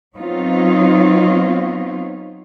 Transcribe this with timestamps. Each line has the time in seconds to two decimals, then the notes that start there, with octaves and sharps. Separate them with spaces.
0.16 F#3 B3 C4 D#4 F4 C#5